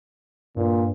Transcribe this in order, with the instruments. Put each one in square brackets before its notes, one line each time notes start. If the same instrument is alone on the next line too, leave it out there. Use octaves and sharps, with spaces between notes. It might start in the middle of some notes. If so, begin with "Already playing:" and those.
[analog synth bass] G2 [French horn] A#2